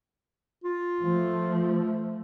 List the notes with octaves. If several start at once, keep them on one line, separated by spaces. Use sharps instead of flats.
F4
F3 A3